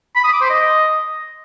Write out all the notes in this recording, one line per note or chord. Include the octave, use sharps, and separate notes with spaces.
B5
D#6
D6
C5
D#5